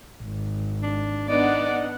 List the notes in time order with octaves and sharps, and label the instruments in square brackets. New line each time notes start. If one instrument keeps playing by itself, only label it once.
[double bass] G#1
[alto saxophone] D4
[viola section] B3 D4 F#5 [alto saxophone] D#4 [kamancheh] D5